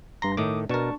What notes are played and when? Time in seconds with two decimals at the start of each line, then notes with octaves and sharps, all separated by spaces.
0.22 G2 A#5 C6 A#6
0.37 A2 D#3 A3 D6 D#6
0.69 B2 D4 A#4 A5 C#6